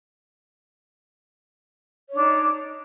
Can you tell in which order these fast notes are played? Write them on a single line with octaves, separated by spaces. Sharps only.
C#5 D4 D#4